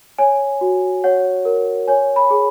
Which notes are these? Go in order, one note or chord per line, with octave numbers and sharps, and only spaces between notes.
C#5 G#5
F#4
C#5 F#5
A#4
C#5 G#5
B5
G#4